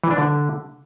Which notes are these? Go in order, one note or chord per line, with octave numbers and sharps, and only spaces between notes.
E3
D4
D3